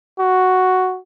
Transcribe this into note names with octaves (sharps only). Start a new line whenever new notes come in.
F#4